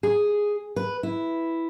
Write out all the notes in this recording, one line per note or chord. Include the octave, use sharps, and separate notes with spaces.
G#4
B4
E4